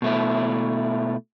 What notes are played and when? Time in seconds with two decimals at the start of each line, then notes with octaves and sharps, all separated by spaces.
0.02 B2 A3 E4